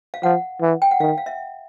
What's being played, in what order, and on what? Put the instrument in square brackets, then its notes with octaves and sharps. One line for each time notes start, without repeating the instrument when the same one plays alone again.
[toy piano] F5
[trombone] F3 [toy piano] F#5
[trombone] E3
[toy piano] G5
F#5
[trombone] D#3 [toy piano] F5
[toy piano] F5
E5